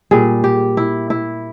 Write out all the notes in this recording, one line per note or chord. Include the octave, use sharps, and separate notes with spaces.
A#2 G3 G#4
G4
E4
E4